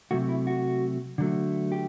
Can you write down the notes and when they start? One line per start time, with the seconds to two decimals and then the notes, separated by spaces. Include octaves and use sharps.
0.11 C3 F#3 A3 F#4
0.29 E4
0.47 F#4
1.18 D3 F#3 A3
1.72 G4